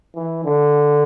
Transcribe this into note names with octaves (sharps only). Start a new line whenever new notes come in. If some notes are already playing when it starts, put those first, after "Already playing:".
E3
D3